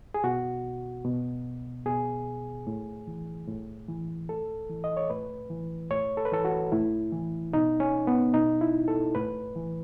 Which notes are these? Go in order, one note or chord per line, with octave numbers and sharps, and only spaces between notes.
G#4
B2 F#4
B2
B2 G#4
A2
E3
A2
E3
A2 A4
E3
D#5
C#5
A2 B4
E3
A2 C#5
A4
B4
E3 A4
F#4
A2 E4
E3
B2 D#4
C#4
B3
B2 D#4
E4
A4
A2 B4
E3